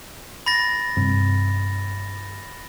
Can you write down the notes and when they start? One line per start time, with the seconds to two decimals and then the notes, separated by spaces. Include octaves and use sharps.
0.46 B5 A6 A#6
0.97 G2 C3 C4